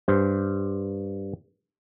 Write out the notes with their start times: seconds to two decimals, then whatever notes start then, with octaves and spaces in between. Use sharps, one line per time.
0.08 G2 C5